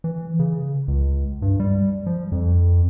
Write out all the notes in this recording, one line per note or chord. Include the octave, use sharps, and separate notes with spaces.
E3
C#3
C#2
G2
G3
F3
F2